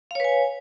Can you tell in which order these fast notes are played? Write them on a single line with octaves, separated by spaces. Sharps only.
F5 C#5 B4 G#5